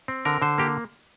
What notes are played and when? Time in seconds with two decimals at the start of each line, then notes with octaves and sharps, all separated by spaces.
0.08 C4
0.25 D3 A#4
0.42 D3 C5
0.58 A#3 G4